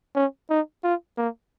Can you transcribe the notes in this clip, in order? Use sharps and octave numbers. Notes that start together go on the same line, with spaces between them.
C#4
D#4
F4
A#3